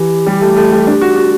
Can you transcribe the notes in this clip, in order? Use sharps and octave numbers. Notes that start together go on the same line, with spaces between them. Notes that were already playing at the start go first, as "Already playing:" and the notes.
Already playing: E3 G4
G3
A3
A3
G3
D4
F#4
F#4